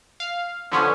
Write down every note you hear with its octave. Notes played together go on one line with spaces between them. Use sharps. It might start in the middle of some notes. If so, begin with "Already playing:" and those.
F5
D3 F3 B3 C#4